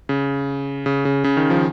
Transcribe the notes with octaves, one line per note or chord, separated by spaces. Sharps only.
C#3
C#3
C#3
C#3
D#3
F3
D#3